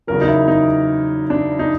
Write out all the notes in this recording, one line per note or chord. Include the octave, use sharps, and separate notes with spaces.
E2 C#3 F#3 A#4
D#4
E4
D#4
D4
D#4